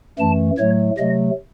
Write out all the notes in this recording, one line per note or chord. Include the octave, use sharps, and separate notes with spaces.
F#2 E3 A3 A5
A2 F#3 A3 C#5
C3 F#3 A3 D#5